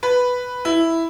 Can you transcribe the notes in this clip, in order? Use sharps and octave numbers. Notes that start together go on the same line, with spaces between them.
B4
E4